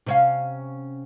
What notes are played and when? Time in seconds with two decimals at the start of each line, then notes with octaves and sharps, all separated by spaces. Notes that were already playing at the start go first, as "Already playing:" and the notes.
0.06 C3 C#4 F5